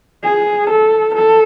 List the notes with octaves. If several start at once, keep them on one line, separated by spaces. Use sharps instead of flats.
G#4
A4
A4